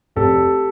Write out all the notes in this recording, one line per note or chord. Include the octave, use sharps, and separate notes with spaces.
F1 G4 A4